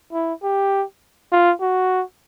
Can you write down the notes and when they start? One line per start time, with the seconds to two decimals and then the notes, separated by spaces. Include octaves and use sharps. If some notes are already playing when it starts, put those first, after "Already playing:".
0.12 E4
0.43 G4
1.32 F4
1.61 F#4